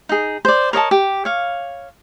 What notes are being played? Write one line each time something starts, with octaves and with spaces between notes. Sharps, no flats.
D#4 G#4
C5 D5
A#4 C#5 D#5 A5
G4
C#5 F5